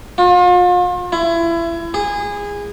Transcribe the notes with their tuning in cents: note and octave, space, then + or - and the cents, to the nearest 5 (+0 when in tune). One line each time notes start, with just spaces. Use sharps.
F4 +40
E4 +30
G#4 -20